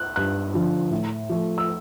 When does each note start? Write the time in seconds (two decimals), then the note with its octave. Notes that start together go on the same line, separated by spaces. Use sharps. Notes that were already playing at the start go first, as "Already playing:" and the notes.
Already playing: F#6
0.16 G2 F#6
0.54 D3 F3
0.91 A2
1.29 F3 A3
1.58 E6